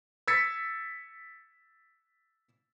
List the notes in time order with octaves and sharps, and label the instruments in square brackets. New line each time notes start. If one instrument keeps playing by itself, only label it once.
[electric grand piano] E6 G#6 A6 B6 C#7